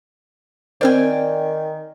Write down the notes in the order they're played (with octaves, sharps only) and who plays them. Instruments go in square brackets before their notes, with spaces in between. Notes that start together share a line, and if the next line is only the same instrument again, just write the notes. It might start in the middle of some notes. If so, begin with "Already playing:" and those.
[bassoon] D#3 [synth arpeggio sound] C4 A#4 C5 [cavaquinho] D5 G5 G#5